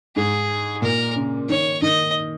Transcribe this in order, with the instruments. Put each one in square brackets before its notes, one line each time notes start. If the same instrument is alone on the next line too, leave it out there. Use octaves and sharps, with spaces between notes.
[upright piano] G#2 [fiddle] G#4
[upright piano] A#2 [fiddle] A#4
[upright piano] C#3
[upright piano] D#3 [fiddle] C#5
[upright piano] D#3 [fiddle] D#5